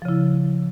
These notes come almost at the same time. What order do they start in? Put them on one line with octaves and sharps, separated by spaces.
F3 C#3 E4